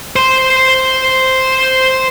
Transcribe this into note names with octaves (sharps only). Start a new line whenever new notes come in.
C5 C6